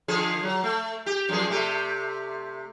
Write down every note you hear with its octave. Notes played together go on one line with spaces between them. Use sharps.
D3 F3 G#4
F#3
A3
G4
F#2 F3 G#4
C3 A3 G4